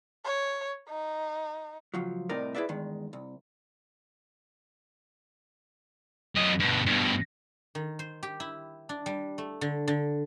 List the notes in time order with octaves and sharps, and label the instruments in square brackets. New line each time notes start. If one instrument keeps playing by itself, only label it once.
[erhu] C#5
D#4
[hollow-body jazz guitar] C#2 F3 F#3
C2 A2 C3 D#4 A#4 D5
E4 G#4 B4 D5 E5
E2 G2 D#3 G#3
C2
[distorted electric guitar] F#2 D#5
G2 B2
G2 B2
[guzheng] D#3
C5
G4
E4
D4
G3
A3
D3
D3